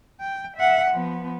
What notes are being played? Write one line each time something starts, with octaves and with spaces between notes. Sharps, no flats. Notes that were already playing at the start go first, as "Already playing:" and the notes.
G5
E5 F#5
F3 B3